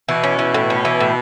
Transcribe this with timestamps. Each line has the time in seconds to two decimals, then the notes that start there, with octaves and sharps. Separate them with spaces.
0.09 B2 E3
0.24 C#4
0.39 E3
0.54 A2
0.70 C#4
0.85 E3
1.00 A2